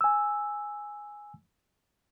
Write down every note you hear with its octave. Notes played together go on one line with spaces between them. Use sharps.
G#5 E6